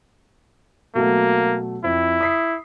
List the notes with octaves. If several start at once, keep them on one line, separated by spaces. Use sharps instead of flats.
B2 F#3 A3 A#3
F2 E4
D#6 B6 C7